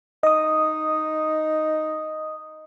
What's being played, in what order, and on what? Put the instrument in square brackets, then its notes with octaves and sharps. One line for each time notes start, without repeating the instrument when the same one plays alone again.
[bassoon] D#4 [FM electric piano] D#5 D#6